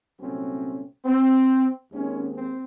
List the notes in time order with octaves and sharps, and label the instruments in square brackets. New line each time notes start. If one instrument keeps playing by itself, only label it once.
[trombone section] C2 A#2 F#3 A3 C4 C#4
C4
D#2 D#3 G#3 C4 C#4
C4